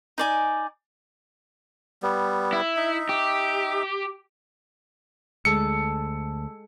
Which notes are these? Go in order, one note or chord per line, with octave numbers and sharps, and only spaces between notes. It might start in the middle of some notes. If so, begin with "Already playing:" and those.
D#4 D5 G#5
G3 B3
E4
D#4 E5
G4
D2 G#3 A4 A5 E6 C#7